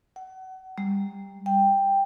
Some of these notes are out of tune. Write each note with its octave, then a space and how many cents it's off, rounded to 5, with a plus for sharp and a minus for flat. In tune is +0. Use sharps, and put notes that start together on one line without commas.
F#5 +30
G3 +20
G5 +5